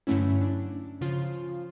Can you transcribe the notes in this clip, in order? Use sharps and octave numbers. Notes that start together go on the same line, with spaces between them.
G2 D3 F#3 A3 C#4 E4
D4
C#3 F3 F4